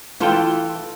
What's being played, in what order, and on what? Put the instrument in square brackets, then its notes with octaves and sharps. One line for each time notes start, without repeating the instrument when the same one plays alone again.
[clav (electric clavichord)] E3 A4 G5 [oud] E4 F4